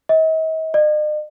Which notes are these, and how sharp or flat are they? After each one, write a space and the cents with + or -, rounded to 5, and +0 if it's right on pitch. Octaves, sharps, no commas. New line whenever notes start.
D#5 +45
D#5 -45